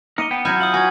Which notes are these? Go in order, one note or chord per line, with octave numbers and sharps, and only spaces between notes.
A#3 D#4 A#4 C#7 D#7 G7
B3 G5
F#3 E4 F6 G6 D#7
F4 D#6 F#7
F#4 B4 G#5 G#6